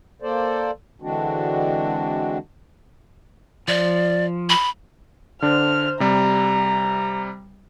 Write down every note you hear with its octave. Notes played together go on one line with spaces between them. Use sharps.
A#3 A4 C5 D5
D3 E3 G#3 C4 D4 F#4
F3 D5
B5
D3 D4 C5 F6
C3 G3 A#5